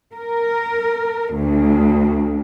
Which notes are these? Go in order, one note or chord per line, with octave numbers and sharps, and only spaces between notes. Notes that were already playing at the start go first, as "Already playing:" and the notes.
A#4
D2